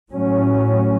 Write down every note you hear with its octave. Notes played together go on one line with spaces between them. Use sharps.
A2 F#3 C#4